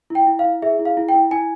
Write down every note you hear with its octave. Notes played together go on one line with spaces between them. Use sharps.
E4 G5
E4
F5
E4
G#4 E5
E4
F5
E4
G5
E4
E4 G#5